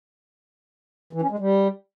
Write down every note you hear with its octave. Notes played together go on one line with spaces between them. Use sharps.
E3
C#4
G#3
G3